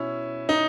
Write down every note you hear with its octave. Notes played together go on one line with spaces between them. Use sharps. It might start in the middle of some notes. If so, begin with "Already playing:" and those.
Already playing: B2 C#4 E4
D#4